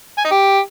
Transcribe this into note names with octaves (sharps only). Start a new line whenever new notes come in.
G#5
D#4
G4